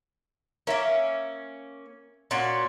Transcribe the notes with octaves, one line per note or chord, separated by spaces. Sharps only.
A#3 C#4 A#4 E5
A#2 C#4 F#4